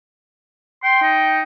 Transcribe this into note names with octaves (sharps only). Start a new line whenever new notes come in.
G5 C6
D#4